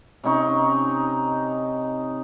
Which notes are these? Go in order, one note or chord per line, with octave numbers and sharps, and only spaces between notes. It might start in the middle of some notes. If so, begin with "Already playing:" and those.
C3 C#4 D#4 C#6